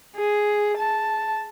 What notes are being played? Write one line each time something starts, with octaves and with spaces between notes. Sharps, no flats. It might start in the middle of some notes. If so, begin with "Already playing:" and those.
G#4
A5